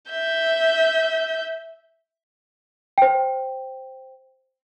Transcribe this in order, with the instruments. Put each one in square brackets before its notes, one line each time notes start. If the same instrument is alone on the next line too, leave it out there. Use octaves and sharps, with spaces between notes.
[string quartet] E5 G6
[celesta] C5 G5